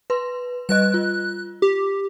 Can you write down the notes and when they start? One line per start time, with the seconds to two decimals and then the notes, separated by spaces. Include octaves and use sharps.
0.10 B4 C6
0.69 G3 B4 D#5 F#6
0.94 F4
1.62 G4